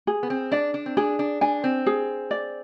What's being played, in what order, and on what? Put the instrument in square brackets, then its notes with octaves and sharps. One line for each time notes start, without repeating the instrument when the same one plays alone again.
[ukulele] G#4
[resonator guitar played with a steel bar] B3
C4
[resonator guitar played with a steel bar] D4 [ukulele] D5
[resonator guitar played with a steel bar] D4
C4
[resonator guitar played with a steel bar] D4 [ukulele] G#4
[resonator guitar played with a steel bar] D4
[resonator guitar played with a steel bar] D4 [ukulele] G#5
[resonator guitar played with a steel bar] C4
[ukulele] G#4
D5